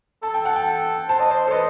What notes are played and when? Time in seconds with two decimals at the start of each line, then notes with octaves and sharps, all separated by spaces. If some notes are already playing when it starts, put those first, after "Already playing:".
0.23 A4 A5
0.34 G5
0.45 F#5
0.56 G5
1.09 C5 A5
1.20 D#5
1.31 C5
1.47 A4
1.52 B4 D#5